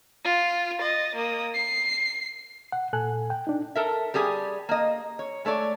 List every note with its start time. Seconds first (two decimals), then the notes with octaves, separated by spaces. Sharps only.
0.25 F4
0.79 D#5 A6
1.15 A#3 D#6
1.55 C7
2.72 F#5
2.93 A#2 A4 G#5 F#6
3.30 G5
3.47 D4 D#4
3.75 A4 A#4 E5
4.14 G3 G4 G#4 G#5
4.69 A#3 D#5
5.19 C#5
5.45 G#3 A3 C#5 D5